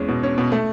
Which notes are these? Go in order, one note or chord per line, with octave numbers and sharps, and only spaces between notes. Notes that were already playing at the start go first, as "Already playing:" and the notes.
Already playing: E2 G#3 C#4
B2
C#4
B2
A3